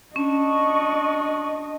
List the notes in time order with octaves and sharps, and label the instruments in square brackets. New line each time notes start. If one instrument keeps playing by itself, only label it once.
[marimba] C#4 [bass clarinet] D4 [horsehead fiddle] D#5 [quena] C#6